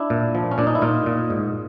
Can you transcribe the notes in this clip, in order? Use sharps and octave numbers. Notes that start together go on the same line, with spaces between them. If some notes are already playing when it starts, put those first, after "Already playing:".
Already playing: D4 E4
A#2
F3
C#4
A#2 D4
D#4
E4
A#2 D#4 F4
A#2
G#2